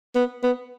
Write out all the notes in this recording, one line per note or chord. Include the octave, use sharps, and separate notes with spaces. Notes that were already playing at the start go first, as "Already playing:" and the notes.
B3
B3